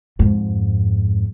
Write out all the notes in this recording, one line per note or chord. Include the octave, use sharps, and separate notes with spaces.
F2 G#2